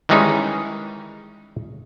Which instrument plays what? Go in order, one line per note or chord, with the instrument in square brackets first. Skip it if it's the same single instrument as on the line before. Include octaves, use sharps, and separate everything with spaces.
[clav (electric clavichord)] D#3 E3 G3 G#3 C#4 D#4